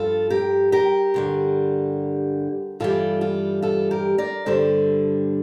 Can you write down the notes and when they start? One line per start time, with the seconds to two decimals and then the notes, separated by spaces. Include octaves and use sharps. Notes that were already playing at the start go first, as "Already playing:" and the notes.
Already playing: G2 F3 F4 A4
0.30 G4 A#4
0.72 G4 A#4
1.14 G2 D3 G3
2.80 G2 E3 G3 F4 A4
3.21 F4 A4
3.62 F4 A4
3.91 G4 A#4
4.18 A#4 D5
4.46 G2 D3 G3 A4 C5